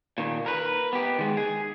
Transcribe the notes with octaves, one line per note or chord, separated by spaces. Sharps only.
A#2 D#3
A#4 B4
B3 G4
D#3 G#3
G#4